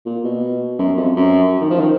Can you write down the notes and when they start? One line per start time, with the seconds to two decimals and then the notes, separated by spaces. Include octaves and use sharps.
0.05 A#2
0.24 B2
0.79 F#2
0.97 F2
1.16 F#2
1.61 D#3
1.70 F3
1.80 D#3